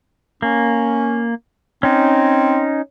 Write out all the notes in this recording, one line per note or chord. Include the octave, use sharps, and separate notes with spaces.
A#3 C#4
C4 C#4 D#4